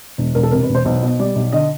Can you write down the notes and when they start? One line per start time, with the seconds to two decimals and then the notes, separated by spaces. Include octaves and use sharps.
0.18 E1
0.35 E1 A#4
0.43 A4
0.52 C3 A#4
0.63 B4
0.69 E1
0.75 C5
0.85 B1 C5
1.03 B2
1.20 G3 D5
1.36 B1
1.53 D3 D#5